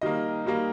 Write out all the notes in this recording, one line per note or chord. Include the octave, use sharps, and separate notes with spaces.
D#3 G3 A#3 D#5
D#3 G3 A#3